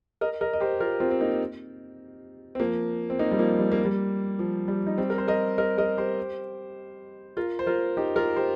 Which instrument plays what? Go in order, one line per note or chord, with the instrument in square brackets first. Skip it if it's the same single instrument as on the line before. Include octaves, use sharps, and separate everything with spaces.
[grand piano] A#4 D#5
A#4 D#5
D#5
G4 C5
F4 A#4
C4 F4
C4
A#3 D#4
C4
F3 A#3
C4
A#3 D#4
G3
F3 A#3
G3
A#3
G3
F3
G3
D#4
G3 C4
A#4
C5
A#4 D#5
A#4 D#5
A#4 D#5
G4 C5
F4 A#4
C5
F4 A#4
D#4 G4
F4 A#4
G4 C5